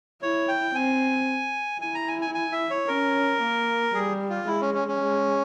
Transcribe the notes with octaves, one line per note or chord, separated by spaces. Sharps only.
E4 C#5
G5
C4 G#5
E4 G#5
A#5
G#5
G#5
G#5
E5
C#5
C#4 A#4
A#3
G3 G#4
F4
G#3 E4
C#4
C#4
C#4
G#3